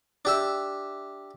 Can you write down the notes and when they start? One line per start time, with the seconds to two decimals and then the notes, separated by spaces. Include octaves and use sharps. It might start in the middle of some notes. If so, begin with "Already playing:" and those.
0.25 D4 G4 E5